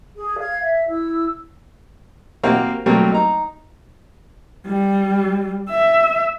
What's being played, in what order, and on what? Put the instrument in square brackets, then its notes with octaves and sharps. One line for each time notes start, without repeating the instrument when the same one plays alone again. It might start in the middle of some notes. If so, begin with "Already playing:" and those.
[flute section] G#4
F5 G#6
E5
E4 E6
[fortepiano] A#3 C4 F#4 G4 F5
F#3 G3 A3 A#3 C4
D#4 A#5
[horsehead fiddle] G3
E5